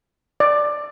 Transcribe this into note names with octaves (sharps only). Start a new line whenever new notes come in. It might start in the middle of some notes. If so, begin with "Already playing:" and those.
D5